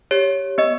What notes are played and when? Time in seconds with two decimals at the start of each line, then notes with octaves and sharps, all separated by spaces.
0.11 G4 C#5
0.58 B3 D#5